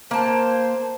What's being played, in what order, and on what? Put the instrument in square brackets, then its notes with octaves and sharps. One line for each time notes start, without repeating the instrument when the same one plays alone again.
[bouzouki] A#3 A5 [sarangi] C5